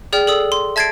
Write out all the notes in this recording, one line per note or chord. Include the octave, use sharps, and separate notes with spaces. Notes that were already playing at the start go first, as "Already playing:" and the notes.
G#4 D5 G5 F6
A4 D5 D#6 E6
C6
E5 A5 G#6 A6 C7 D7